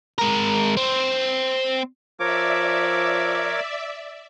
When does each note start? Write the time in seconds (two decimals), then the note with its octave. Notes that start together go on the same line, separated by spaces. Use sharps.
0.19 G#3 A#4
0.77 C4
2.20 F3 A#4 C#5 D5 E5 D6